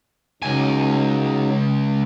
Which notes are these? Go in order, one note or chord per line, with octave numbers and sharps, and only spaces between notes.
C#2 C#3 F#3 D#4 G#5